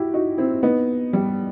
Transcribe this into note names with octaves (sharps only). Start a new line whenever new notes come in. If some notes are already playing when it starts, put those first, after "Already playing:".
Already playing: E4 F#4 G4
D#4 F#4
C4 E4
B3 D#4
G3